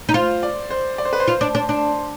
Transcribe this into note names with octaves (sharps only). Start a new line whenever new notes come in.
D#4
F4 C5
D5
C5
D5
C5
B4
C5
F4
D4
D4
D4